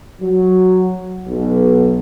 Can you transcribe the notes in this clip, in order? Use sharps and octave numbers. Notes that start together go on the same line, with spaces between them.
F#3
B1